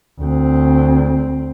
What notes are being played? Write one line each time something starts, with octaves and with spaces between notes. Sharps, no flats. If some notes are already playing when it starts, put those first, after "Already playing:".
D2 C4